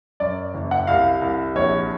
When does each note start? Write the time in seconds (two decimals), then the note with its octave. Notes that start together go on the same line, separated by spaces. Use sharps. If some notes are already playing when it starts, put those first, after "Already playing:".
0.20 F#2 D5
0.54 F#1
0.71 F#5
0.87 C2 F5
1.22 C2
1.55 A#1 C#5